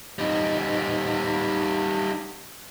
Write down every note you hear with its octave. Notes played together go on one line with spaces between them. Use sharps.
G3 D#4